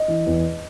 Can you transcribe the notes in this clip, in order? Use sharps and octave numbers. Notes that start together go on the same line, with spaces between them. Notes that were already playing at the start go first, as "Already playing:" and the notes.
Already playing: D#5
E3
E2